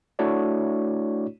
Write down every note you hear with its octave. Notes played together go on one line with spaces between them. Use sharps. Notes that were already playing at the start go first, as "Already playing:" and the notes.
A3 D4 E4 F#4 C#5 D5